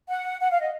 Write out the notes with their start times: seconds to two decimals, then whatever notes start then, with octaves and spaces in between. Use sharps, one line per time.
0.09 F#5
0.40 F#5
0.51 F5
0.61 D#5